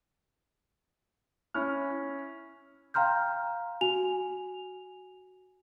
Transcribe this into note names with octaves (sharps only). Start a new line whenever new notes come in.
C#4 E4 F6
F5 G5 A#5 C6 F6 G6
F#4 G#5 F7